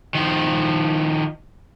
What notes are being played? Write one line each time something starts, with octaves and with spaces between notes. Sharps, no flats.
D#3 F3